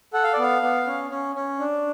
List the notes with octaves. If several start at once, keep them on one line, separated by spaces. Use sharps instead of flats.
A4 F#5
F5
D5
B3 F5
B3
C#4
C#4
C#4
D4